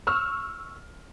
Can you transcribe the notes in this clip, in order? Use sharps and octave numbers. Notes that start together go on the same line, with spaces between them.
C#6 E6 F6